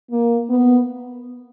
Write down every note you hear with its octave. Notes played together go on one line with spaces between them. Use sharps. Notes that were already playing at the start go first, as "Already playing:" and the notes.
A#3
B3